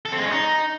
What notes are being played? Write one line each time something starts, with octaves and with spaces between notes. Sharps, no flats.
A4
C4
G#3
C#4
D#4